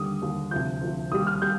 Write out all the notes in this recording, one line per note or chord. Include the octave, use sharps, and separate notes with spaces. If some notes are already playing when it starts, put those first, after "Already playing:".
Already playing: D#2 D3 G3 D#6
D#2 D3 G3
D2 C3 F3 G6
D2 C3 F3
D#2 D#3 G3 D#6
F6
G3 G6